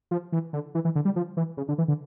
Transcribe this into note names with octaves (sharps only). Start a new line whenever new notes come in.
F3
E3
D3
E3
E3
D3
G3
F3
E3
C#3
D3
E3
D3